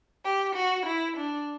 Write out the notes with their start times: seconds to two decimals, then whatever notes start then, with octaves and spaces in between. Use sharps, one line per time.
0.25 G4
0.56 F#4
0.87 E4
1.17 D4